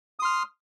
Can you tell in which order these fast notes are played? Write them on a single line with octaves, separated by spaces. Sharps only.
D#6 C6 F6